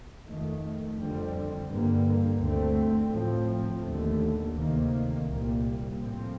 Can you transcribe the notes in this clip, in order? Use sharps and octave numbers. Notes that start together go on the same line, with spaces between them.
F2 D#3 A3
F2 D3 G3 C4
G2 D3 G3 A#3
D2 D3 A3 C4
A2 F3 C4
D#2 D3 A3
D2 C3 D#3 A#3
C2 A#2 G3 A#3
A2 F3 C4